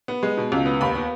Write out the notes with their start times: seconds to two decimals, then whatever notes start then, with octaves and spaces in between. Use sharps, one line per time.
0.08 B3
0.23 G#3
0.37 B2
0.52 C#2
0.66 B3
0.81 D#2 B5
0.95 B3